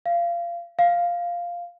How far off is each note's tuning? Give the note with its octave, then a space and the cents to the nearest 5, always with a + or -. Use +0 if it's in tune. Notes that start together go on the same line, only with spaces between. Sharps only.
F5 -25
F5 +0